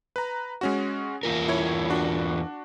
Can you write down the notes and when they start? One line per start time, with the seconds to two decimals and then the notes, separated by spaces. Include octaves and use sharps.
0.16 B4 A#5
0.61 G#3 C#4 F#4
1.23 E2 F4 A#4
1.48 E4 C#5
1.90 D4 F#4